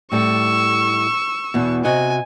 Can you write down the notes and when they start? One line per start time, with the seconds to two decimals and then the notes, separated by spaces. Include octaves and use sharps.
0.12 A2 G3 A4 C#6 E6
1.54 E2 B2
1.84 C3 F#4 D#5 G#5